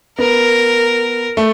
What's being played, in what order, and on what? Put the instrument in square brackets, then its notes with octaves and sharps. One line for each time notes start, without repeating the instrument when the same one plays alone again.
[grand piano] B3 [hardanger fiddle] A#4
[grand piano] A3